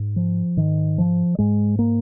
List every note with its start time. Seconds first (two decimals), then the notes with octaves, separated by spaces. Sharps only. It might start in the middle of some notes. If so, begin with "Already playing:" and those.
Already playing: G#2
0.16 F3
0.57 G#2 D#3
0.98 F3
1.38 G#2 G#3
1.79 A#3